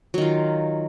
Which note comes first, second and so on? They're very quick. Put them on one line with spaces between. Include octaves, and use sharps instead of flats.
F#3 D#3 F4